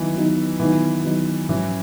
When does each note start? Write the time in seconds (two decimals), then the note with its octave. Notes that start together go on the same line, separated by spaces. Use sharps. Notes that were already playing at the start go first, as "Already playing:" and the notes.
Already playing: D#3 E3 F#3 B3 D#4
0.15 D#3 F#3 B3 D#4
0.60 D#3 E3 F#3 B3 D#4
1.04 D#3 F#3 B3 D#4
1.49 G#2 E3 F#3 C#4 E4